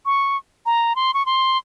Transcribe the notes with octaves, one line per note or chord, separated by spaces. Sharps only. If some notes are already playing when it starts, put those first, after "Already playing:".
C#6
A#5
C6
C#6
C6